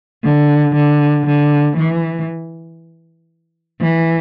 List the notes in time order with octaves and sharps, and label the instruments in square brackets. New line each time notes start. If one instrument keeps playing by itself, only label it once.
[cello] D3
D3
D3
E3
E3